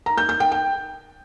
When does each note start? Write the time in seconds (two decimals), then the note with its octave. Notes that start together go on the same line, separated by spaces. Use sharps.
0.06 A#5
0.18 G6
0.29 G6
0.40 G5
0.52 G5